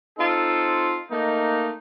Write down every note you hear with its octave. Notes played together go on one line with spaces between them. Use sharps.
C4 D#4 F4 A4
A3 A#3 D#4